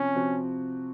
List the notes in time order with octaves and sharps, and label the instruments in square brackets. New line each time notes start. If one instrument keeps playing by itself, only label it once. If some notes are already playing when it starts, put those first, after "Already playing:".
Already playing: [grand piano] C3 F3 C4 [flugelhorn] C#4
[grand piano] C3 F3 C4 F#4